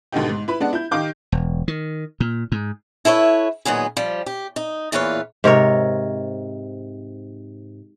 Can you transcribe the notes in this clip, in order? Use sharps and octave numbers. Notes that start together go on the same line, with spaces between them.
G#1 B2 D3 B3 D#4 G4
G#2
E4 B4 B5
G#3 B3 D4 D5 F#5
E4 G6
D#3 D#4 G4 F5 D6 G6
E1
D#3
A#2
G#2
E4 A4 B4 C#5
A#2 D#3 F#3 B3 G#4
F3 G3
G4
D#4
E2 A#2 E3 B4 C#5 F5
G#2 C3 A#4 C#5